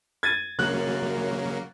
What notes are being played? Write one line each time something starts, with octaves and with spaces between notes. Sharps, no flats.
G#6 A6 D#7
F#2 C#3 F#3 A#3 F#6